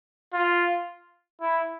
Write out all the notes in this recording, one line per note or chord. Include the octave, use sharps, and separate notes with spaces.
F4
E4